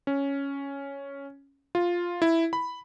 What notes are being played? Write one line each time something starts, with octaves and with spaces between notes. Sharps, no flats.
C#4
F4
E4
B5